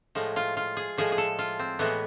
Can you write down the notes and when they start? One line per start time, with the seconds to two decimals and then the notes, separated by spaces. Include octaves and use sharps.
0.15 A2 F3 G#3
0.36 F4
0.57 F4
0.77 G#4
0.98 A2 F3 G#3 G#4
1.12 G#4
1.18 A4
1.39 F4
1.59 C4
1.79 A2 E3 G#3 B3